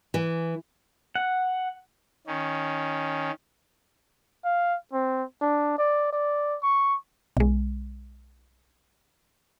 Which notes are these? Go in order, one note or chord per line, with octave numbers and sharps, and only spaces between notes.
E3
F#5
D#3 C#4
F5
C4
D4
D5
D5
C#6
B1 G#3